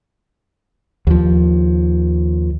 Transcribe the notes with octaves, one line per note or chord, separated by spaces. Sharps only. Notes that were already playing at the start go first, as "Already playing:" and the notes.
D#2 F3